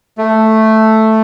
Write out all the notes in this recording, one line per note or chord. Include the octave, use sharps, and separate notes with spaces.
A3